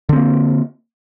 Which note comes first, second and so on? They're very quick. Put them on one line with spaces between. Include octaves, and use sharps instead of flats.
D3 C4 A#3